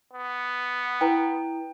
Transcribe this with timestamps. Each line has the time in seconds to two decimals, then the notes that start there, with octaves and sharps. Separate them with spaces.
0.13 B3
1.01 E4 B4 G5 A#5